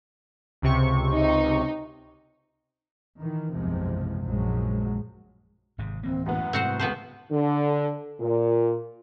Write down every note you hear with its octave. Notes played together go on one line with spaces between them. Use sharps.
C#2 C3 C#6
D#4
D#3 E3
F#1 B1 E2 C3 F3 G#3
A#1 F#2 F3 F#3 G#3
G#1 G#2 C3
D1 E3 A#3 C4
F#2 A2 B3 F#5
G#2 C3 G3 C4 F#4 C5
C#2 B3 B4 C5 A5
D3
A#2